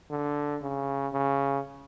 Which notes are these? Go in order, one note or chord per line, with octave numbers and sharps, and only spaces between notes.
D3
C#3
C#3